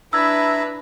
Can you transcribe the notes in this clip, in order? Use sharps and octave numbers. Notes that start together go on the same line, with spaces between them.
D4 E4 B4 E5 A#5 E6 G#6